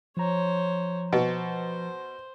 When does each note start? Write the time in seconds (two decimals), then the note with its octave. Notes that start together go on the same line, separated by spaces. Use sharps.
0.17 F3 C5 C#5 A#5
1.13 B2 C5